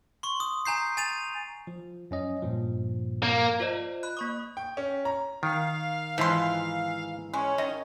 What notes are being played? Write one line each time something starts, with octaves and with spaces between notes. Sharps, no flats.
C6 C#6
D#6
G#5 A#5 G6 C7
G#5 A6 D#7 F7
F3
F#2 C#4 D#5
G2 A#2 F3
A#3
F4 C5 D5 D#5
B5 F#6
A#3 C#6 D#6
G5
C#4
A#5
D#3 F5
G#2 E3 F3 C6
G#3 C#4
D#3 D#5